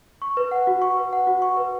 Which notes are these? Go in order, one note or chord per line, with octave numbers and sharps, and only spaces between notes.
C#6
B4
F#5
F#4
C#6
B4
F#5
F#4
C#6
B4